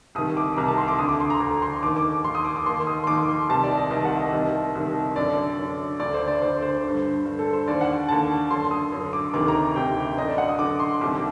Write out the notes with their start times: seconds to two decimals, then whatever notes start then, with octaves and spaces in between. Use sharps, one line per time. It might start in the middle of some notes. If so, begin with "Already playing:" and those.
0.15 C2 C3 D#3 D#6
0.37 D6
0.57 C2 C3 D#3 A#5
0.68 A5
0.78 C6
0.88 D6
0.99 D2 D3 D#6
1.09 D6
1.20 C6
1.30 A#5
1.40 D2 D3 A#5
1.62 C6
1.83 D#2 D#3 D6
1.97 D6
2.24 D#2 D#3 C6
2.35 D#6
2.45 D6
2.56 D6
2.65 D#2 D#3 C6
2.87 D#6
3.04 C6
3.07 D#2 D#3 D6
3.28 C6
3.49 C2 C3 D#3 A5
3.63 D5
3.77 D#5
3.91 C2 C3 D#3 D#5
4.05 F#5
4.20 D#5
4.33 C2 C3 D#3
4.75 C2 C3 D#3
5.16 F#2 D3 D5
5.59 F#2 D3
5.99 D2 D3 D5
6.14 C5
6.27 D5
6.42 D2 D3 C5
6.62 C5
6.83 D3
6.88 G2
7.25 G2 D3
7.39 A4
7.53 C5
7.68 D#2 D3 D5
7.81 F#5
8.09 D#2 D3 A5
8.51 F#2 D3 C6
8.71 D#6
8.92 F#2 D3
9.13 D6
9.34 D2 C3 D#3 D6
9.48 A#5
9.76 D2 C3 D#3 G5
10.17 F#2 D3 D#5
10.28 D5
10.38 F#5
10.49 D#6
10.59 F#2 D3 D6
10.80 C6
11.01 C2 C3 D#3 D6